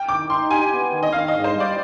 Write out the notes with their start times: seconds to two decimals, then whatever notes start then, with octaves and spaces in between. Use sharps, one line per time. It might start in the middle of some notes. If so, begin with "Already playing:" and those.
Already playing: G5
0.09 D#3 D6
0.30 D#4 C6
0.51 G4 G#5
0.72 B3
0.92 D#3
1.03 D#5
1.13 D#3 F5
1.28 D#5
1.33 G#2
1.44 C5
1.55 G3
1.60 D5